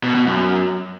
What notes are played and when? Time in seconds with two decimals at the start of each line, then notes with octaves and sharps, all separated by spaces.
0.03 B2
0.15 B2
0.27 F#2